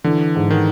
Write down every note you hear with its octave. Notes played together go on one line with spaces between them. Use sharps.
D3 E3
G#2
D#3